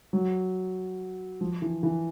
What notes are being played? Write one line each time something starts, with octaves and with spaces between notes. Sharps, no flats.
F#3
F3
E3
E3